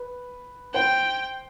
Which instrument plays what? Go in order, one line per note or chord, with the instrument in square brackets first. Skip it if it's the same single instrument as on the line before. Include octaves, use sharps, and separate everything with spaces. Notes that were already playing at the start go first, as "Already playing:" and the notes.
Already playing: [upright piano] B4
[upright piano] C5 [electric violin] G5